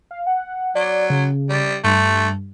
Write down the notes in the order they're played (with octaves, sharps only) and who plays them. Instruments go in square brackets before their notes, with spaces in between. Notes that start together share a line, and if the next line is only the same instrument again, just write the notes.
[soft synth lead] F5
F#5
[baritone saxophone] F#3 [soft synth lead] D5
[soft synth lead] C#3
[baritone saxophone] G3
[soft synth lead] G2 [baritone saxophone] A3